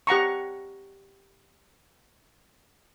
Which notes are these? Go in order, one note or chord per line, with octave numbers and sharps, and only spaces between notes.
G4 F#5 A#5 C#6